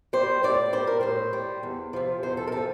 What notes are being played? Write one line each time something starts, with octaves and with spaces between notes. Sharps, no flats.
G3 C5
A2 D5
G3 C5
A#4
A2 C5
G3
E2
C3 F3
E2 C5
A4
A#4
C3 F3 A4